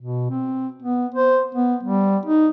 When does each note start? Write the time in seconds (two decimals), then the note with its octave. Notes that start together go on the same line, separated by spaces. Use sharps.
0.02 B2
0.30 C4
0.82 B3
1.14 C5
1.55 B3
1.83 G3
2.25 D#4